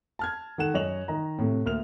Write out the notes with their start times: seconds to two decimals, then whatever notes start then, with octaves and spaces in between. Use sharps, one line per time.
0.19 A5 F6 G#6
0.58 D#3 A4 F#5 F#6 E7
0.74 F#2 C#5 D#5 C#6 F7 F#7
1.08 D#3 D#5 A#5
1.38 A2 C3
1.65 D2 A#3 F6 F7